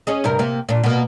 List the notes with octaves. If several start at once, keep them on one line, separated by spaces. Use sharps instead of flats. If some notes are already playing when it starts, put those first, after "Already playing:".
C#4 G#4 D#5
G2 C3 A#4
C3 A#3
A#2 D4
B2 A#3